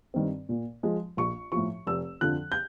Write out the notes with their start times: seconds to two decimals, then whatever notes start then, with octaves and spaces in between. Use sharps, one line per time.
0.14 G2 D#3 G3 C4
0.49 A#2
0.83 F3 G#3
1.17 A#1 C#6
1.52 A2 F3 C#6
1.87 F1 E6
2.21 F2 D3 F3 F#6
2.52 G6